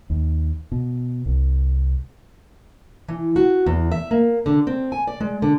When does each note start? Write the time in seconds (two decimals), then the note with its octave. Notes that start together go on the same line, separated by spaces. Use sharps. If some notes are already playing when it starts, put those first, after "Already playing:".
0.10 D#2
0.72 B2
1.26 C2
3.09 E3
3.36 F#4
3.66 E2
3.92 E5
4.11 A#3
4.46 D3
4.67 C4
4.92 G#5
5.07 D5
5.21 G#3
5.42 D3